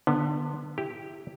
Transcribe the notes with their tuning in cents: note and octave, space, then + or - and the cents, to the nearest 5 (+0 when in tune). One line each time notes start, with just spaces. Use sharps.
D3 +25 B3 -15
E4 +0 G4 +0